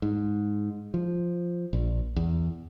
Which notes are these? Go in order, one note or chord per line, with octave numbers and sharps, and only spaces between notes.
G#2
F3
A#1
E2